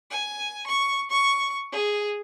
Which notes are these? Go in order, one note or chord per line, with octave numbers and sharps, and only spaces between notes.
G#5
C#6
C#6
G#4